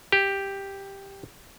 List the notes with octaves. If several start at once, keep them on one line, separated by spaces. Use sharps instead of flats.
G4